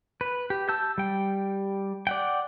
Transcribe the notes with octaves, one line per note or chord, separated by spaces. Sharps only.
B4
G4
A5 E6 G6
G3 G5
D5 F#5 G5